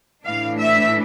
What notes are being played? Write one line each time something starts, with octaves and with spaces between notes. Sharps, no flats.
A2 E3 A3 D4 F5
E5